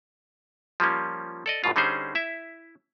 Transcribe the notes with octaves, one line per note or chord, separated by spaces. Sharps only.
F3 G3 A#3 C#4
A4 D5 D#5
G#1 G#2 B2 F4
D3 G3 C#4 D#4 G#4 C5
E4 E5